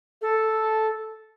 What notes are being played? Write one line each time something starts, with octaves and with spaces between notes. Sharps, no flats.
A4